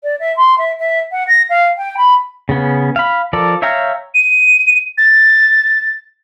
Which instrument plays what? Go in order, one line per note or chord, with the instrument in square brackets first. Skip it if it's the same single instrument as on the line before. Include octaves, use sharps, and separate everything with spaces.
[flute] D5
E5
C6
E5
E5
F#5
A#6
F5
G5
B5
[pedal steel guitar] C#3 B3 C#4
F5 B5
F3 A4 A#4 D5
C#5 E5 F5 G5 A#5
[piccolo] D#7
A6